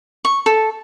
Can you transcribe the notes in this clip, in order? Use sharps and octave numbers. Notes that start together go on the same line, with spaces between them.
C#6
A4